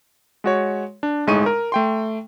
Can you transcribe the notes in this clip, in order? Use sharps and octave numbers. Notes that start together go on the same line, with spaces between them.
G#3 F#4 C#5
D4
G1 A2 G#3 D#4 C#6 D#7
A#4
A3 G5 C6